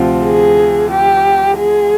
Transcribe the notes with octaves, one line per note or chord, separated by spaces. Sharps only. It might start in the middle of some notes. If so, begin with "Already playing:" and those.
Already playing: D2 C3 F3 C4 F4
G#4
G4
G#4